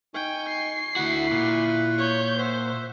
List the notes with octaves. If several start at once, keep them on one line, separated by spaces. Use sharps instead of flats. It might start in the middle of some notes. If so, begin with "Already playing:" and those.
D#4 G5 G#5 C#6
C7
D2 E4 F#4 B4 B5 C#6
A#2
C#5 G6
C5 E5 F#5